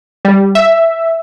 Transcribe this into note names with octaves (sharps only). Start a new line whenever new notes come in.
G3
E5